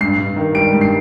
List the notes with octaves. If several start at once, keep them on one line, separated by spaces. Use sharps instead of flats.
G2 C7
G2
D#3
G3 D7
G2
C7